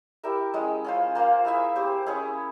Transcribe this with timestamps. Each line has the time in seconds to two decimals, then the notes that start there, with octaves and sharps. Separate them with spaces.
0.23 E4 G4 A#4 E5
0.54 G#3 C#4 E4 G#4
0.84 C#4 F4 C5
1.15 A#3 F4 C5 F5
1.45 E4 G#4 C5 E5
1.76 C4 G4 C5
2.06 C#4 E4 G#4 C#5